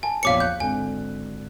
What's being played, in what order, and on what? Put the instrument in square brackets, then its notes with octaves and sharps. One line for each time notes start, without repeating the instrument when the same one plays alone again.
[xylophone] G#5 [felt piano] A5
[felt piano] A#1 E2 C#5 [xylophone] F5 D6 C#7
[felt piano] F#6 [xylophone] G6
[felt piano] G#1 D3 [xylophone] G#5